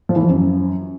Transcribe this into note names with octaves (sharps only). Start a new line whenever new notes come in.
F3
E3
F3
F#2